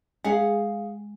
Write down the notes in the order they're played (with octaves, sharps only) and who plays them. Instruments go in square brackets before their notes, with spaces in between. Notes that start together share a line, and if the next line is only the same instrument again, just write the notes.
[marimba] G#3 [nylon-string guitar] G#4 F5 F#5